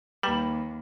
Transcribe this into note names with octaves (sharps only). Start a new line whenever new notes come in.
D#2 G3 B4 G5 A#5 B5